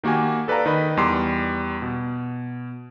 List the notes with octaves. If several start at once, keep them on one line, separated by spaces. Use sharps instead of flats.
D#3 A#3 F#4 G4 G#5
A4 B4 D5 F5 A#5
D#3 B4 D#5 B5
E2 G3 C6 D6 C7
B2